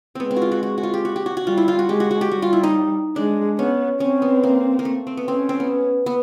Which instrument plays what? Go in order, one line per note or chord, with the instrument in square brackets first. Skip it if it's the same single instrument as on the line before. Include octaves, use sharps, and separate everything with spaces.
[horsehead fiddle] G#3 [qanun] B3 C4
[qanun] C4
F#4
F4
F#4
F#4
F#4
F4
G4
F#4
G4
F#4
F#4
[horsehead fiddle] G3 [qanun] F4
[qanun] E4
F4
F#4
[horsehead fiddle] G#3 [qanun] G4
[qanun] F#4
F#4
G4
[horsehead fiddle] G3 [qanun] F#4
[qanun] F4
E4
D#4
[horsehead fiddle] G#3 [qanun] D4
[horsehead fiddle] B3 [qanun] C#4
[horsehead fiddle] C4 [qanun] C#4
[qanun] B3
A#3
A#3
A3
C4
B3
[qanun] C4 [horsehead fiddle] C#4
[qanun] C4
B3
B3